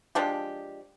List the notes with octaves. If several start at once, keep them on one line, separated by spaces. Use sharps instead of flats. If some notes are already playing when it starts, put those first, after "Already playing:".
F3 G#3 D4 G4